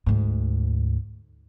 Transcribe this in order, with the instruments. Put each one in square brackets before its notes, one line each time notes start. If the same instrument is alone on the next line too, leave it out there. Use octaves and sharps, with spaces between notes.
[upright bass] D2 G#2